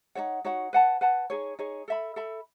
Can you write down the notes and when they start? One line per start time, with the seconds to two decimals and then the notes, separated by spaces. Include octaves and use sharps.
0.15 D#4 F#4 C#5 F#5
0.45 D#4 F#4 C#5 F#5
0.73 B4 F#5 A5
1.01 B4 F#5 A5
1.30 D#4 G#4 C#5
1.59 D#4 G#4 C#5
1.88 A4 E5 B5
2.16 A4 E5 B5